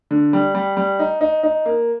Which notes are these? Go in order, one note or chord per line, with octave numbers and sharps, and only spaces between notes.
D3
G3
G3
G3
D#4
D#4
D#4
A#3